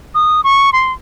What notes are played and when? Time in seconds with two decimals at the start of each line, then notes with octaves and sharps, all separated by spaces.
0.15 D#6
0.44 C#6
0.73 C6